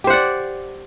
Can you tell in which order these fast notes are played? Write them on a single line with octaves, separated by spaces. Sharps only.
G4 C5 F#5 D5